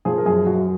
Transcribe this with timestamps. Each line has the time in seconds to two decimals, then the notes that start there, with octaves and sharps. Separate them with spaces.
0.05 F3 G#4
0.18 A#4
0.26 F#2 G#4
0.46 F#2 F#4